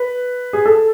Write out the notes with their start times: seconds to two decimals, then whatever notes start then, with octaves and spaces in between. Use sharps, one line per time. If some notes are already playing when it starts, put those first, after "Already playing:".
Already playing: B4
0.53 G#4
0.66 A4